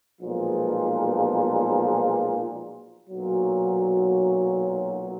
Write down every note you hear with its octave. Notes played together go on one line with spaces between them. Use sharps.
B1 A#2 F3 G#3 B3
B1 A#2 F#3